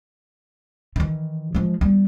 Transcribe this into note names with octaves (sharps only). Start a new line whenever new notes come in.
D#3 E3
F3 G#3
G3 B3